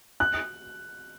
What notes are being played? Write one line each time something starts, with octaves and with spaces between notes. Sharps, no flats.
F#6